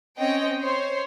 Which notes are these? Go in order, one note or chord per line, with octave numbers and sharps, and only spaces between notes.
C4 C#4 C#5 D#5 G5
C5 C#5 C6